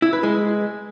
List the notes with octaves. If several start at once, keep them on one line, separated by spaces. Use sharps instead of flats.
E4
B4
G#3